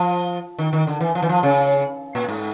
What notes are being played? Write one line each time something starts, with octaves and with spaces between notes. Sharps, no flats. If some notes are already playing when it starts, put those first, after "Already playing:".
Already playing: F3
D#3
D#3
D3
E3
F3
E3
F3
C#3
A#2
G#2